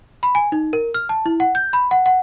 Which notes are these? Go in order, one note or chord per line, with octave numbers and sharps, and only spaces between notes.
B5
G#5
D#4
A#4
F6
A5
E4
F#5
G6
B5
F#5
F#5